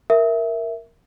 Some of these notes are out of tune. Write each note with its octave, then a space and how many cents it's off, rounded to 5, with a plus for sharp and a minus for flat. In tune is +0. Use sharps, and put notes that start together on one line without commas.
A#4 +0 E5 +0